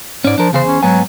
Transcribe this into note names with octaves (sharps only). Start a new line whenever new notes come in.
G#2 C#4 D5
F3 D4 A#4
E2 C#3 G#4 C5
C#4
G#2 F#3 B3 G#5